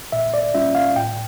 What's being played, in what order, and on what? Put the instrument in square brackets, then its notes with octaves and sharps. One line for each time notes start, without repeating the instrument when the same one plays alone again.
[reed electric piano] A#2 E5
D5
G3 C#4 F4 E5
F5
A2 G5